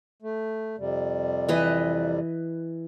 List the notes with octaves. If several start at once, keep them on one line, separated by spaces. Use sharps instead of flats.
A3
F2 C3 G3
E3 B4 D#5